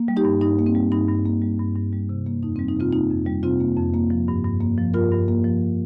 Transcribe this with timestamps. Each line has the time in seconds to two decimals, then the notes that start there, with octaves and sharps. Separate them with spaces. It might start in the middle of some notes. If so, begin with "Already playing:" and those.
Already playing: A#3
0.08 G3
0.17 D#4 G4
0.25 G2
0.41 G2 D#4
0.59 A#3
0.66 C4
0.75 G3
0.92 G2 D#4
1.09 G2
1.25 A#3
1.42 G3
1.59 G2
1.76 G2
1.93 G3
2.09 C3
2.26 A#3
2.43 F2 D#4
2.56 G3 C4
2.68 D#4
2.76 C3 C4 F4
2.93 A#3 D#4
3.10 F2
3.26 G3
3.43 C3 C4 F4
3.60 A#3
3.77 F2
3.94 A#3
4.10 F3
4.28 G2
4.44 G2
4.61 A#3
4.78 F3
4.94 G2 F4 A#4
5.12 G2
5.28 A#3
5.44 F3